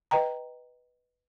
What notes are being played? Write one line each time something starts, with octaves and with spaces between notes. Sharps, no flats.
B4 D#5 G5 A#5